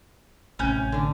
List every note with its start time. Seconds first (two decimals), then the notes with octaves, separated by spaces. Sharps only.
0.59 A1 C3 C#4 G6
0.92 D3 D4